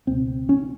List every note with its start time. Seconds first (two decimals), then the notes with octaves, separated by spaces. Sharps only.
0.07 C#2 B2 C4
0.49 C#4